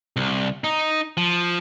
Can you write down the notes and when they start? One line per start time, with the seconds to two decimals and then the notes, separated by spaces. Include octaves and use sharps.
0.16 C2
0.64 D#4
1.17 F3